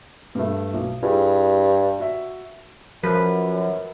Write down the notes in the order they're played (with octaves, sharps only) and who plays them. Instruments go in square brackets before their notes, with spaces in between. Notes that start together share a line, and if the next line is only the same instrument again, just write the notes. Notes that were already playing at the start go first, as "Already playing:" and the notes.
[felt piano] G2 A3
B1
[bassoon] G2 [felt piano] E4 G#4
[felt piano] F#4 E5
[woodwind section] F#2 [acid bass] F3 [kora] B4